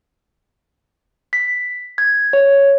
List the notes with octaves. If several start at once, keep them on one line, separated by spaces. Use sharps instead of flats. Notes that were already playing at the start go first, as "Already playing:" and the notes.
B6
G#6
C#5